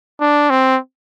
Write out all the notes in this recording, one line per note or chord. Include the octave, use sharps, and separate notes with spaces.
D4
C4